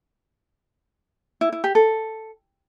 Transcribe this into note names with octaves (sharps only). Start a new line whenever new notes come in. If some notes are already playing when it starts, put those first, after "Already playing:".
E4
E4
G4
A4